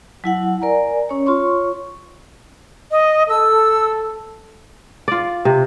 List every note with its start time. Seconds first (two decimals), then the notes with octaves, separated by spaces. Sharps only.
0.24 F#3 E4 F#5
0.62 A#4 D5 G#5 A#5
1.09 C#4 C#5
1.26 F4 C#5 C6 C#6
2.91 D#5
3.29 A4 E6
5.08 F4 D5
5.45 C3